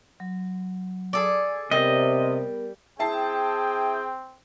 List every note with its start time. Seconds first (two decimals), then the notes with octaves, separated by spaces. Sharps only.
0.20 F#3
1.13 G#4 A4 D5
1.71 C3 G3 B3 A#4 D#5
2.99 C4 E4 G#4 G5 A5 C7